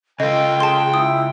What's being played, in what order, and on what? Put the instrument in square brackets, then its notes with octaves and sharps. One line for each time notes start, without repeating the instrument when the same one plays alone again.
[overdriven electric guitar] C#3 F4 [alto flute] A4 [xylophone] D#5 [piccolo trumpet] G5
[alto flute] G#4 [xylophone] A5 C6
[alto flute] E4 [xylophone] D#6